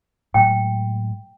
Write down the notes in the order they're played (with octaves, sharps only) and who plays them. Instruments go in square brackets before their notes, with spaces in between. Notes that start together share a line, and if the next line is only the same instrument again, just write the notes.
[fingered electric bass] A2 F#3 G#3 [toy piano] G5